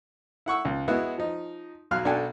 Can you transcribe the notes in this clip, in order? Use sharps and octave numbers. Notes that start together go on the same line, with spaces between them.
E4 F#5 C#6 E6
C#2
G#3 B3 E4 F#4
F3 D#4
B1 F#3 F5 F6 F#6
B1 D4 F#4 A4 G5 G#5